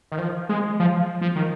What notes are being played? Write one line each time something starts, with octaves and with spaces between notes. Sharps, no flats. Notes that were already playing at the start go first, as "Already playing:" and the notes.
D#3
F3
G#3
F3
F3
D#3